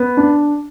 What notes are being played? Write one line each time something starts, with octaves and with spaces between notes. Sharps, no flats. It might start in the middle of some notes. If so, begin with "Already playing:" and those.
Already playing: B3
D4